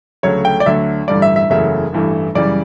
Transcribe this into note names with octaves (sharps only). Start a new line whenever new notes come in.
D2 C#3 F#3 A3 C#5
G5
D5
D2 D3 F#3 E5
A1 G2 D3 G3 D5
E5
E5
F#1 E2 C#3 F#3 A3 E5
A1 G2 E3 A3
F#2 C#3 E3 G3 D5